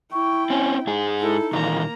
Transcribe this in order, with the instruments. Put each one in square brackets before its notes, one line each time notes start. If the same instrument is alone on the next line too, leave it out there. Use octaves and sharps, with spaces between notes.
[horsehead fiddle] E4 G5 [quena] C#6
[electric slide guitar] C4 C#4 [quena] G#5
[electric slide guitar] G#2 G#4 [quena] D#4
[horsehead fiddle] E4 A4
[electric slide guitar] A#2 D#3 E3 [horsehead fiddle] A#3 A#5